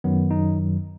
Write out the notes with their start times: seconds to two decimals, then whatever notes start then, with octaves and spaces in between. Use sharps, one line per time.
0.04 F#2 D#3 F#3 B3
0.31 D#4